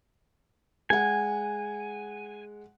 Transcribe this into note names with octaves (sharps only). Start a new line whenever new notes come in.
G#3 F#5 G#5